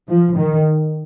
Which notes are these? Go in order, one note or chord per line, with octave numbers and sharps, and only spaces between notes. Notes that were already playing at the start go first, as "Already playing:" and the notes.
F3
D#3